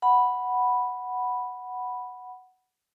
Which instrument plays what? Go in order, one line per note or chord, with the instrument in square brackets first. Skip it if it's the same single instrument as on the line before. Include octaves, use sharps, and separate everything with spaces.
[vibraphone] F#5 B5